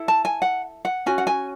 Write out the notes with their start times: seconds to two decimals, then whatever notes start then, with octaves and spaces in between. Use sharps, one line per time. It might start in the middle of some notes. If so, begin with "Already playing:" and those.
Already playing: E4 A4
0.08 A5
0.25 G#5
0.42 F#5
0.85 F#5
1.06 C#4 F#4 G#5
1.18 F#5
1.27 G#5